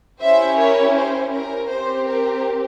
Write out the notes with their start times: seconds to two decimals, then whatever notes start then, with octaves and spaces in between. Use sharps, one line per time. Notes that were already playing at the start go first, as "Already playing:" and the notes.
0.21 C#4 E4 G4 C5 E5
0.59 A#4 C#5
0.95 C5
1.32 A#4
1.69 C4 G4 C5
2.07 A#4